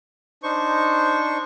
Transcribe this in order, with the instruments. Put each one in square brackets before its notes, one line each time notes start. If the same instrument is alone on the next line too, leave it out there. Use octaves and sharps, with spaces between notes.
[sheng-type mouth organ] D4 D#4 C5 C#6